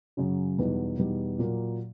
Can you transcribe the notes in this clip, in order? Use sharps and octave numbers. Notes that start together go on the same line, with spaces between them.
F#2 C#3 F#3
E2 B2 G3 B3 D#4
E2 B2 G3 B3 D#4
A#2 F#3 A#3